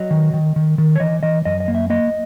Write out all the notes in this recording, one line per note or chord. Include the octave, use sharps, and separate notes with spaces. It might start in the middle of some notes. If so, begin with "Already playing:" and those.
Already playing: F#3 D#5
D#3
D#3
D#3
D#3
C#5
E3 D#5
E3 D#5
F#2 D#5
D#5
A#3
E5
A#3 D#5